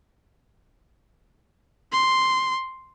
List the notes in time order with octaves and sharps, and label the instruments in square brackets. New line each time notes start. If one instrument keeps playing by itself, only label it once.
[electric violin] C6